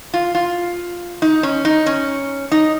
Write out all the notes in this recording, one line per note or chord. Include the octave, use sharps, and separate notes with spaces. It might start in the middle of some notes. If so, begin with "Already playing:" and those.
F4
F4
D#4
C#4
D#4
C#4
D#4